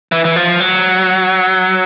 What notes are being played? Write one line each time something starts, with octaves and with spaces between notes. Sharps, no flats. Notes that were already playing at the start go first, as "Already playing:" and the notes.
E3
E3
F3
F#3